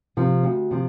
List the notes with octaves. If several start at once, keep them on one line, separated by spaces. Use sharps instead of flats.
C3 F3
D2
C3 F3